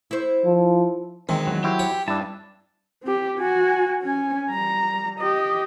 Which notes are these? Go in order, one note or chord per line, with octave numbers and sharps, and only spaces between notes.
E4 C5
F3
E2 D#3 G#3 C4
F#3
E4 F#4 G4 C5
C#5
G2 D4 E4 A5
C4 G4
F#4 G#5
C#4 G#5
G3 A#5
G4 D#5